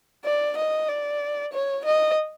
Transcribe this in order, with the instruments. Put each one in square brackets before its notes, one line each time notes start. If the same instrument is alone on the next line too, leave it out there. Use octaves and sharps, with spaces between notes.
[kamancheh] D5
D#5
D5
C#5
D#5